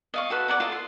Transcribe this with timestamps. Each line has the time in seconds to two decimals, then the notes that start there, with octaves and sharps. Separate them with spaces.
0.14 D#5 F5 C#6
0.30 F#4 A4 B4
0.48 D5 F#5 A#5
0.60 F4 A4 D#5
0.72 C6